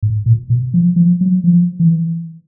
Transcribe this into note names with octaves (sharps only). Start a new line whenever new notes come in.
G#2
A#2
B2
F3
F3
F#3
F3
E3